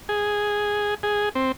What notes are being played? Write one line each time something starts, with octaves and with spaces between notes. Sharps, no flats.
G#4
G#4
C4